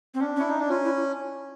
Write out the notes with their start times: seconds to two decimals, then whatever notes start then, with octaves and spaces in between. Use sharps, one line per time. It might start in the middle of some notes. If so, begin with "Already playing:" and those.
0.14 C4
0.20 C#4 D4
0.36 C#4
0.39 E4
0.49 D#4
0.59 D4
0.69 C#4 F4
0.85 E4